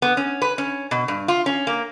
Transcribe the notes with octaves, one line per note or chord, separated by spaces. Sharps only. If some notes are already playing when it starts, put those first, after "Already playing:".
B3
C#4
B4
C#4
B2
G2
F4
C#4
A#3